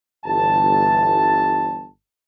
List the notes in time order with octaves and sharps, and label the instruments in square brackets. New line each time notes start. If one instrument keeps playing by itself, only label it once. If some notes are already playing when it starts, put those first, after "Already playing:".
[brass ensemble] G1 E3 A5